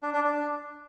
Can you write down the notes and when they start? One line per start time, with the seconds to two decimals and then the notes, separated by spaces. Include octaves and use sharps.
0.03 D4
0.14 D4
0.24 D4